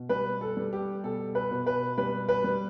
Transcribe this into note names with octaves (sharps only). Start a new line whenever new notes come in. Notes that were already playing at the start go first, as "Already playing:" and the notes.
Already playing: B2
G3 B4
A4
G3
G4
B2 A4
B4
B2
B4
G3 B4
B4
G3